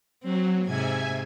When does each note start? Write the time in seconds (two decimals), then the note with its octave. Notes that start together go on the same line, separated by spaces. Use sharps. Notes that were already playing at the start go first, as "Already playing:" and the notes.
0.23 F#3 C4
0.65 G#2 C3 E5 G#5 G#6